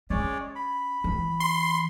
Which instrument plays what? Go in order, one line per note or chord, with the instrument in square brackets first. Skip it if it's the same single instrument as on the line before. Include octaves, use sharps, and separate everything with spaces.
[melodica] G#3 C#5 D5 [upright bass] C#4
[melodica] B5
[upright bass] E3
[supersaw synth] C6